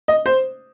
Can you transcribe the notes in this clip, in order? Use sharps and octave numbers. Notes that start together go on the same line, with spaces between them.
D#5
C5